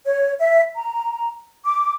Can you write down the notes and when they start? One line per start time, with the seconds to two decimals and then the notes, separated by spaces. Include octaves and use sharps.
0.06 C#5
0.40 E5
0.75 A#5
1.64 D6